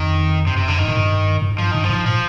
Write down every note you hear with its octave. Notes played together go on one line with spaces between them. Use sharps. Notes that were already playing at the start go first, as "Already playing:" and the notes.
Already playing: F2 D#3
G2 C3
F2 C3
D3
G2 D#3
G#2
G2
G2
G#2
G2 F3
G2 D#3
F3
G#2
A#2 F3